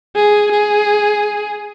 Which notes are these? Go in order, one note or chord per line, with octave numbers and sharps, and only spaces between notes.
G#4
G#4